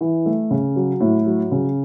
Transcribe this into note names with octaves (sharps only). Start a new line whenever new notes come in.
E3
A3
C#3
F#3
A2
F#3
C#3